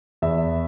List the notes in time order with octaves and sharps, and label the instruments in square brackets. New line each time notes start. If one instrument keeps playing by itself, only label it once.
[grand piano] E2 E5